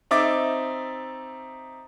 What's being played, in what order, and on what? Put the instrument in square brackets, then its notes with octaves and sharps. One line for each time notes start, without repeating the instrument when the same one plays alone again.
[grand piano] C4 D#4 E5 D6 A6